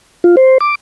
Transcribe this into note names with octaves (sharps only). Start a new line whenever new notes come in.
F4
C5
D6